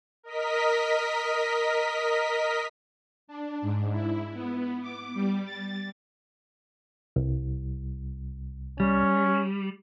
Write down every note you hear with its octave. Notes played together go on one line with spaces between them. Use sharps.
A#4 D#5 B6
D4
G#2
E4
B3
D6
G3
A6
C2
G3 C#4